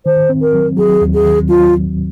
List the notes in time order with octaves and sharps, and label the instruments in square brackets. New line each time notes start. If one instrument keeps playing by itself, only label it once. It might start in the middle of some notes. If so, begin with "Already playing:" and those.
[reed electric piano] D#3 [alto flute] C5
[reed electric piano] C4
[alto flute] A#4
[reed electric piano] F#3
[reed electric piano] F#3 [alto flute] G#4
[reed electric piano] D#2
[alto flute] G#4
[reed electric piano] D#3
[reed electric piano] F#3 [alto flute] F4